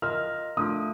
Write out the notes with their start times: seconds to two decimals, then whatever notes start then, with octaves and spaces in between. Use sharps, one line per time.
0.02 F4 A#4 D#5 F6
0.57 A3 D4 F4 D#6